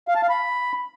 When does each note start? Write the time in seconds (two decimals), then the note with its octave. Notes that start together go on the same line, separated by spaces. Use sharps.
0.08 F5
0.15 A5
0.22 F5
0.29 B5